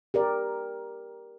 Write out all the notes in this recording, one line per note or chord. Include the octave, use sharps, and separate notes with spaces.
G4 A#4 D5